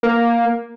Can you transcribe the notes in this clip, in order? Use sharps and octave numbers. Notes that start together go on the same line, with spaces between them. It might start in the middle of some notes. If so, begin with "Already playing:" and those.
A#3